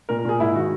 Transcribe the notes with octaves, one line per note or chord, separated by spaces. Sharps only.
A#2 A#4
A#4
A#2 G#4
G#2 E4
D#3 F#4